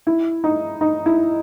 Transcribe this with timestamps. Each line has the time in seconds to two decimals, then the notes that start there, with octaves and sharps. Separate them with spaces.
0.07 E4
0.44 D#4
0.81 D#4
1.06 E4